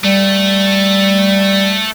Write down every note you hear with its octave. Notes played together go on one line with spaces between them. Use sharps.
G3 A3